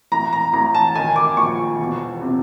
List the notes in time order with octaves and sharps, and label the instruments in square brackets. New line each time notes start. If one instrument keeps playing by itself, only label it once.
[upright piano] A1 A#5
A#5
A1 A#5
A5
D#3 G#5
D6
A#1 C#6
E1
C3